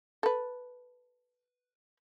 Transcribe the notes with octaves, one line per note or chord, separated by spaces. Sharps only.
A4 B4